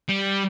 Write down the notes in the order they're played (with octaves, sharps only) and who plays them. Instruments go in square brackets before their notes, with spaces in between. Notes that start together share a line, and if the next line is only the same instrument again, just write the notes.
[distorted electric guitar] G3